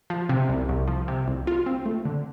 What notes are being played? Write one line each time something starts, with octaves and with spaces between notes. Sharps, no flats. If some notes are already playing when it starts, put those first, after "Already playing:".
F3
C3
C2
C2
F3
C3
C2
F4
C4
A3
D3